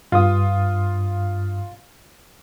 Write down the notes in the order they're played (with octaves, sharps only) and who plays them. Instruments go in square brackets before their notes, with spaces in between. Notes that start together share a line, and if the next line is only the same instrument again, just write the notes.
[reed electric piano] G2 D#6 [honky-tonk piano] F4